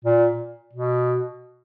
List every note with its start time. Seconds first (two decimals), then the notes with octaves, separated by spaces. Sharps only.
0.05 A#2
0.73 B2